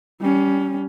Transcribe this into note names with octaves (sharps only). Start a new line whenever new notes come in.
G3 C#4